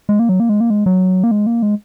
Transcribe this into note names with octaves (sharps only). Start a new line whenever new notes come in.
G#3
A#3
F#3
A#3
G#3
A#3
G#3
F#3
A#3
G#3
A#3
G#3